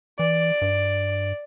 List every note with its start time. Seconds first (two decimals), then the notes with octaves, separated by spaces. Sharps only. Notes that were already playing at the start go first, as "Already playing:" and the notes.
0.19 E3 D5
0.62 G2